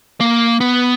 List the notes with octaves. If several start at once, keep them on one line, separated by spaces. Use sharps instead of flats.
A#3
B3